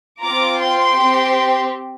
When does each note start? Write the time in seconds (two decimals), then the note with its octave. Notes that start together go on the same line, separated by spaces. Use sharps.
0.21 C4 F4 A#5 D6
0.59 G5 C6
0.95 C4 G4